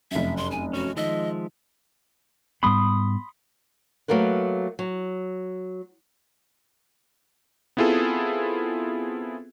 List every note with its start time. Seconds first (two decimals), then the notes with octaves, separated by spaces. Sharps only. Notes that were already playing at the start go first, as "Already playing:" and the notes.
0.11 F1 F#2 E5
0.37 C6
0.51 G#5
0.73 C#4 F#4
0.97 D#3 F3 G#3 D#5 E5
2.63 G#2 G3 B3 B5 C6 D#6
4.08 F#3 A3 A#3 A#4 B4
4.79 F#3
7.77 B3 C4 E4 F4 G#4 A4